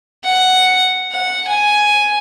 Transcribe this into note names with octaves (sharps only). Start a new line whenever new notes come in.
F#5
F#5
G#5